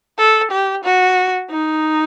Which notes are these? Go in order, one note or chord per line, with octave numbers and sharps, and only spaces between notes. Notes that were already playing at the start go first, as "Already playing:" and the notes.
A4
G4
F#4
D#4